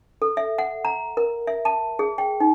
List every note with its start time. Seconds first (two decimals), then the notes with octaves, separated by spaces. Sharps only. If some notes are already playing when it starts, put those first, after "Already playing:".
0.22 A4
0.37 E5
0.59 F#5
0.85 A#5
1.17 A#4
1.47 E5
1.65 A5
1.99 G#4
2.18 G5
2.40 D#4